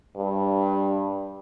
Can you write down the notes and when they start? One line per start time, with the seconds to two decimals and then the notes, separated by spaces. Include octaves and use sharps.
0.16 G2